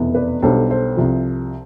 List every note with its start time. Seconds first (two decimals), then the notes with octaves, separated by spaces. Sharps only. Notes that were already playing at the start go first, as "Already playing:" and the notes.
Already playing: F1 E2 B2 B3 E4
0.14 B4 D5
0.42 B1 B2 G3 B3 D4 A4 C5
0.70 A4 C5
0.97 C2 C3 F3